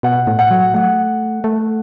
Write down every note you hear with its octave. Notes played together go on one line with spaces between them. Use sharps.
B2 F#5
A2
F#5
F#3
A3 F#5
A3